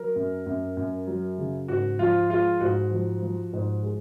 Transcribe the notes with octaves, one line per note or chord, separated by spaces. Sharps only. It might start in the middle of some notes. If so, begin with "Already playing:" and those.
Already playing: F#3 A#4
F#2
F#2
F#2
F#3
C#3
G#2 F#4
F3 F4
G#3 F4
G#2 F#4
F3
F3
G#2
G#3